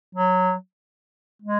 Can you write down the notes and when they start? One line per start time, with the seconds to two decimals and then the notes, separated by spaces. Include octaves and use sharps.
0.15 F#3
1.42 G#3